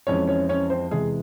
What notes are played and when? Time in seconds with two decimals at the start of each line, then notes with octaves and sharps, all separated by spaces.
0.07 F2 E3 G#3 C4 C#4 C#5
0.27 C#4 C#5
0.49 C#4 C#5
0.70 C4 C5
0.91 E2 C3 E3 G#3 G#4